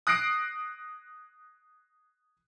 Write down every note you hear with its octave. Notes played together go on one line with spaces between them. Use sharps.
D#6 F#6 A#6 C7 D7